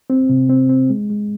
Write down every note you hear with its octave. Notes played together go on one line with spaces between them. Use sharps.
C4
C3
C4
C4
G#3
G#3